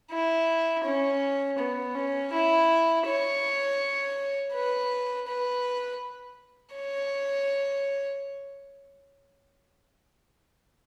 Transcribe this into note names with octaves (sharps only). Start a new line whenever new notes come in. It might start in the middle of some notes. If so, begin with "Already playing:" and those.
E4
C#4
B3
C#4
E4
C#5
B4
B4
C#5